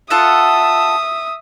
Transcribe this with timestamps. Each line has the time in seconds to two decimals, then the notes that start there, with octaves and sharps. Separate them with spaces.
0.10 F4 A4 E5 F#5 D#6